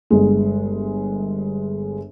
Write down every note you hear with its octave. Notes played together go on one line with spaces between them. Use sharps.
G1 G#3